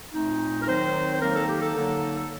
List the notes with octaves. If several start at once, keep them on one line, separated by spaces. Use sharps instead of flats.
A#2 A3 C4 D#4
A#4
D#3 F#3 C4 D#4 C5
C5
D#3 F#3 A#3 D#4 A#4
A4
G4
A4
D3 F#3 A#3 D#4
A4